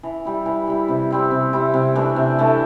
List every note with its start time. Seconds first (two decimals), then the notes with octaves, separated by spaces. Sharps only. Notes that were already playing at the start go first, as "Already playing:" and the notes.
0.03 E3
0.25 G3 E4
0.46 E3
0.68 G3 E4
0.88 C3
1.11 G3 C4 E4
1.31 C3
1.53 G3 C4 E4
1.74 C3
1.95 E3 A3 D4
2.16 C3
2.39 E3 A3 D4